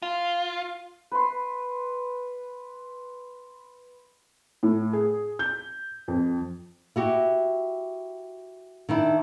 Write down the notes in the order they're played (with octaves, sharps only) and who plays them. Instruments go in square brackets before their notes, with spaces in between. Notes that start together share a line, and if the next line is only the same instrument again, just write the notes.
[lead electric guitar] F4
[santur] B4 C6
[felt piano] A2
G#4
G6
F2
[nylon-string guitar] E4 F#4 G4
D#3 D4 E4